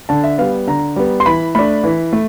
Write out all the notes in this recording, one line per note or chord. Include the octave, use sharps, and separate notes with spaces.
D3 A5
E5
G3 B3 F5
D3 A#5
G3 B3
C6
E3 B5
A3 D4 B5
E3
A3